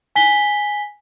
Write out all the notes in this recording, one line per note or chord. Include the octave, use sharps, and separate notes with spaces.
G#5 B6 G7